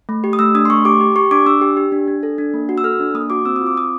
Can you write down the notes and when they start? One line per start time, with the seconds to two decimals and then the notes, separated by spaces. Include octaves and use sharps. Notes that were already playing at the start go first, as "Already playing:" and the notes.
0.09 A3
0.24 G4
0.33 D#6
0.39 A3 E6
0.55 D4 D#6
0.65 C6
0.70 A3 C#6
0.85 G4 D6
1.00 G4
1.16 G4 C#6
1.31 D4 D6
1.46 D4 E6
1.61 G4
1.77 G4
1.92 D4
2.08 D4
2.23 A4
2.38 D4
2.54 A#3
2.69 F#4
2.78 E6
2.84 A4 F6
3.00 D4
3.14 A#3 D#6
3.30 F#4 D6
3.45 C4 E6
3.56 F4 D#6
3.66 D6
3.76 C4 D#6